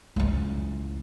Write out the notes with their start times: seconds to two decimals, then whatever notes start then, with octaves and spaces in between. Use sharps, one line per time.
0.16 C#2 E3